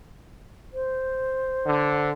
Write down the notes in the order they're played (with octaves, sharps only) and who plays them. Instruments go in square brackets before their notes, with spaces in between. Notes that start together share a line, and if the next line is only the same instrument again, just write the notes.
[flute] C5
[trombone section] D3